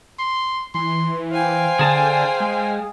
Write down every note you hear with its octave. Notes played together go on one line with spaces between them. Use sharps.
C6
E3 C6
C5 F5 G5 G#5
D3 G#4 A5
G#3